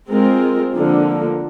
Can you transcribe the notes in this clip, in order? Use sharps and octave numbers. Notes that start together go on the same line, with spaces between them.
G#3 C4 F4 A#4
D3 F3 A#3